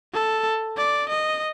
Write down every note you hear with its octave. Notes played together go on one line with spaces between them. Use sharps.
A4
D5
D#5